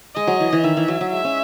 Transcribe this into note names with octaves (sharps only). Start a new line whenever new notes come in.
G#3 D#5
F#3
E3
E3
D#3 E5
E3
F#3
F#3
G#3 E5
C#4